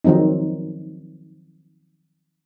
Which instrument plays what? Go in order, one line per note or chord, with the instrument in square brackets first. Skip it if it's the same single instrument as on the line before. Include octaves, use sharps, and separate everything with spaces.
[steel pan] D#3 F3 F#3 C4 D#4